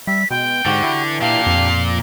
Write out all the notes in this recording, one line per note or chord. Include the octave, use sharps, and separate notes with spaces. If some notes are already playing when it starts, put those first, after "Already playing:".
G3 E5 B6
B2 G#3 G5
G#2 D3 F#4 G4
E3
A#2 D4 G4 F5
F2